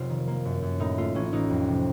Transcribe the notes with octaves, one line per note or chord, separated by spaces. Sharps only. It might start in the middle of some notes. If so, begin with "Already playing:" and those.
Already playing: F1 C3 F#3 D#4 F4
D#3
A#3
F#2
F#2
A2 D#4
A3 F4
A1 C#4
A1 D#4
F2
C3